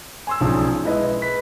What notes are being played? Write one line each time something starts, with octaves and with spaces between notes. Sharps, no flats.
G#5 C6 E6
B1 F3 C#4 D4 G#4
G#3 E4 B4 D#5
B4 B6